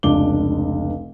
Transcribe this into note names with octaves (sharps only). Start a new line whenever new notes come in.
F1 C#2 D4 D6 G7